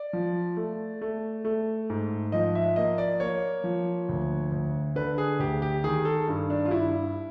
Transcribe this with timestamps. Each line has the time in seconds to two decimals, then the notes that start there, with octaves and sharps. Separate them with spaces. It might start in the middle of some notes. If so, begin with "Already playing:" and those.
Already playing: D5
0.13 F3
0.57 A3
1.01 A3
1.45 A3
1.90 G#2
2.32 F3 D#5
2.55 E5
2.76 A#3 D#5
2.98 D5
3.20 A#3 C#5
3.64 F3
4.09 D2
4.52 D2
4.96 D3 B4
5.18 G#4
5.39 D2 G4
5.62 G4
5.84 D#3 G#4
6.05 A4
6.28 G2
6.50 D4
6.65 F4
6.71 G2 E4